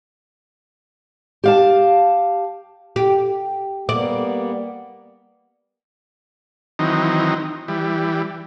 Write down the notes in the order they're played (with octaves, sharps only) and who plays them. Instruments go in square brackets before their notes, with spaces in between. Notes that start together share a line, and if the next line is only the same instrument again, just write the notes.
[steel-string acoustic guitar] G4 F5 A5
[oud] G4
[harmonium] G3 A#3 B3 [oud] D5
[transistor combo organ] D#3 E3 F#3 C4 D#4
E3 G3